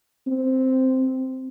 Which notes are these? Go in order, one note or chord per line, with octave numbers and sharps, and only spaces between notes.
C4